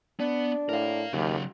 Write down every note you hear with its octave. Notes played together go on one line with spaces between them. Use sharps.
B3 D4
A2 A#4 F5
D#2 C#3 F#3